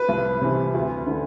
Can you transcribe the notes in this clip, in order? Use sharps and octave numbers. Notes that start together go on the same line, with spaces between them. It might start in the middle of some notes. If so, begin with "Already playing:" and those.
Already playing: B4
C2
C3 E3
D2
D3